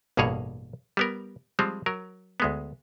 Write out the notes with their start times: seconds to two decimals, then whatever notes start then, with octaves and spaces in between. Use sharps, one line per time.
0.17 A1 G2 B2 A#3 G#4 C#5
0.97 G3 B3 A#4
1.59 F3 G3 G#3 C4
1.86 F#3 A#4
2.40 D2 G#3 B3